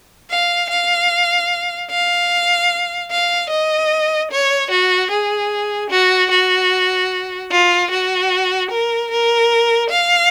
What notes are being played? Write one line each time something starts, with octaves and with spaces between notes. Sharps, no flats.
F5
F5
F5
F5
D#5
C#5
F#4
G#4
F#4
F#4
F4
F#4
A#4
A#4
F5